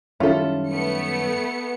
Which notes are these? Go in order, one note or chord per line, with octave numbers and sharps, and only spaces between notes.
F#2 D#3 G3 C#4 E4 F4 A4
A3 B3 C#7